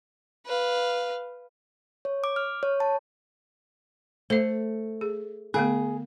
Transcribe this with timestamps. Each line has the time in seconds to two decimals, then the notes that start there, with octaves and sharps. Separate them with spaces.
0.45 B4 F5
2.05 C#5
2.24 D6
2.36 F6
2.63 C#5
2.80 A5
4.30 A3 C5 E5
5.01 G#4
5.54 D3 A3 B3 G#4